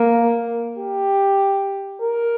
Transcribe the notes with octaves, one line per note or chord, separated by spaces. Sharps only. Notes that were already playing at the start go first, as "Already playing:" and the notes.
Already playing: A#3
G4
A#4